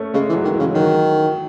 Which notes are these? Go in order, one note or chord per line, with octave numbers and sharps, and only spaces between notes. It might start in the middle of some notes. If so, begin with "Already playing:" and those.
Already playing: A3 C#4
C#3 G#3
E3
F#3
D#3
E3
C#3
D#3 F#3